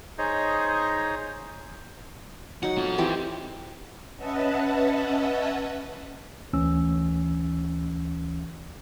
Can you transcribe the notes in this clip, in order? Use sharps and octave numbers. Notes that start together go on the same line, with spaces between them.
D#4 G#4 C5 C#5 D#5
F#3 D#4 F#5
F4 A4
E3 C4 G4
C#4 B4 D#5 E5 F#5 A5
D2 E3 C#4 E6